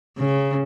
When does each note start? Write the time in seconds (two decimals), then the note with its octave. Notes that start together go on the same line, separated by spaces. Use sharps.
0.17 C#3